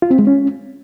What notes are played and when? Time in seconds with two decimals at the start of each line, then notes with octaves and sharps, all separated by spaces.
0.02 F4
0.11 C4
0.19 G#3
0.27 C#4